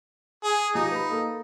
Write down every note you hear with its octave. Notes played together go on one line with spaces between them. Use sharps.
G#4
F3 D#4 G4
B4 B5
A#3 A4